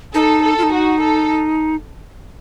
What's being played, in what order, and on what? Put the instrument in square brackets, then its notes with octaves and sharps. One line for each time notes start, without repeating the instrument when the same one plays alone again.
[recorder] D#4 [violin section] A4
[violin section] A4
[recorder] F4
D#4
[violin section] F#4
A4